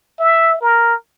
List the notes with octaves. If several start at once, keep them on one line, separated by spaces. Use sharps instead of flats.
E5
A#4